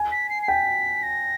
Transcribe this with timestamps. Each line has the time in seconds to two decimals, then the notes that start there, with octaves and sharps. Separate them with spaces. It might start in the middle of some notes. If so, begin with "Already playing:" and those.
Already playing: G#5
0.12 B6
0.30 C7
0.43 C7
0.48 G5 B6
1.03 A#6